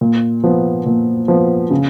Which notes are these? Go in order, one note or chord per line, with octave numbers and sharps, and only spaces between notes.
A#2
F3 B3
A#2
F3 B3
C#3